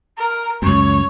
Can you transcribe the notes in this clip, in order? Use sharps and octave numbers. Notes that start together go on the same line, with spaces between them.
A#4
C#2 F#2 C#5